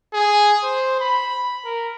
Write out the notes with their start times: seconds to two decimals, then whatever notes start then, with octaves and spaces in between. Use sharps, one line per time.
0.14 G#4
0.64 C5
1.00 B5
1.65 A#4